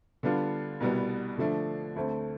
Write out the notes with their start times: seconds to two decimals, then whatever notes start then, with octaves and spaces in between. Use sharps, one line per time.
0.23 D3 G3 B3 D4 F4
0.80 C2 B2 G3 B3
1.38 D3 F3 A3 D4
1.96 D2 D3 A3 C4